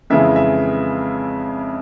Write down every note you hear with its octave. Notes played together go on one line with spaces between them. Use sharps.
F2 C#3 E3 G#3 E5
E5